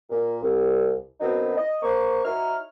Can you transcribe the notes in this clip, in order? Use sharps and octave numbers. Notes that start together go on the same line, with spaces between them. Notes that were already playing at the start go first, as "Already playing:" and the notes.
A#2
C2
F#2 B2 F#3 C4 D#4 E4
D#5
A#3 C5 C#6
D#4 E4 F#4 C#5 A#5 F6